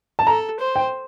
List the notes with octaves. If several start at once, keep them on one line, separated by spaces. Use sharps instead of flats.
A5
A4 A#5
C5
G5